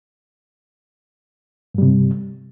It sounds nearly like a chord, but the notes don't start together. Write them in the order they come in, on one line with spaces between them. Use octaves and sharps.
G2 G3 C3